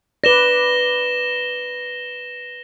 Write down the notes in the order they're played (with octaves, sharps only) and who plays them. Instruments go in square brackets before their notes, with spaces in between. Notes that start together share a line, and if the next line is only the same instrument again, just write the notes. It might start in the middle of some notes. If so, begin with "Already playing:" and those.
[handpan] B4 D5 [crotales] A#6 E7 G7